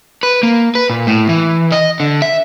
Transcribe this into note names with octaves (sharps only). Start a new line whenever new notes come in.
B4
A#3
B4
A#2
A2
E3
D#5
D3
E5